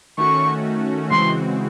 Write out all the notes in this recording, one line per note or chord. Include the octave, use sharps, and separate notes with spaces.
D#3 A3 C#4 F#4 C#6
C#3 E3 G#3 C4 F#4 C6